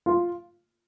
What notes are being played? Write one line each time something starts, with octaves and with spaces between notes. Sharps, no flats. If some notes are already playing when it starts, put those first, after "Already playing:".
F4